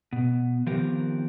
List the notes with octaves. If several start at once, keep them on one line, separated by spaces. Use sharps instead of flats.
B2
D#3 F3 B3 C4 G4 A#4